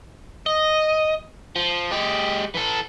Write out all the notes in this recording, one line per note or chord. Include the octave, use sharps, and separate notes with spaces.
D#5
F3
G#3 G4
E3 A4